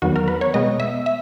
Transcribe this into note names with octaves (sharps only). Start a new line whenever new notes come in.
E2 D#3 F#3 B3 F#4
A#4
B4
C#5
B2 G#3 B3 D#5
E5
E5